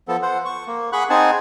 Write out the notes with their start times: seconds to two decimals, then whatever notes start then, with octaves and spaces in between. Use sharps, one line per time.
0.08 F3 B3 A4
0.22 C5 F#5
0.45 C#6
0.67 A#3
0.93 G#4 F#5 B5 C#6 F#6
1.10 C4 D#4 G#4 F#5 G#5 A5